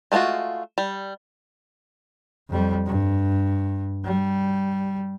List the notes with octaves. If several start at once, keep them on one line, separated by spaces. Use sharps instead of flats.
G#3 A3 B3 F4 F#4
G3
F2 G3
G2
G3